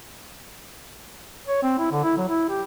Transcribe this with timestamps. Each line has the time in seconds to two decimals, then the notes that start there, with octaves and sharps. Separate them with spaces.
1.47 C#5
1.63 C4
1.79 E4
1.91 D3
2.03 E4
2.17 F#3
2.29 E4
2.49 G4